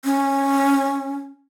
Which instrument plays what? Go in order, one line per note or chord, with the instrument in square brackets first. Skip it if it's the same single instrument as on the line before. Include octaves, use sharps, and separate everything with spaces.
[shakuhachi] C#4